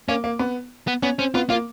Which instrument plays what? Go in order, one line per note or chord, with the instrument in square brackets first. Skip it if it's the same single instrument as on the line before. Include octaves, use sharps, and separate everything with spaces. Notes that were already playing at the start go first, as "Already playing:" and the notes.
[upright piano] A#3 [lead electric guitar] C#4
[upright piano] A#3
B3
[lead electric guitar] B3
[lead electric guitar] B3 [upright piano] C#4
[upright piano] C4 [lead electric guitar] C#4
[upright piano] B3 [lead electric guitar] F4
[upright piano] A#3 [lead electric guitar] F4